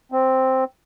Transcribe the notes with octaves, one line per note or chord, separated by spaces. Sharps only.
C4